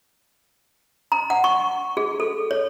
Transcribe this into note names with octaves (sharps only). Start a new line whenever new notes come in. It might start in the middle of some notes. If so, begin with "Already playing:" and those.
A#5
F#5
C#6
G#4
A4
C#5